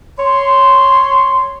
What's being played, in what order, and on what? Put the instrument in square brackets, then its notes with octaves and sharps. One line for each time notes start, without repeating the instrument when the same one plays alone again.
[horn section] C#5 C6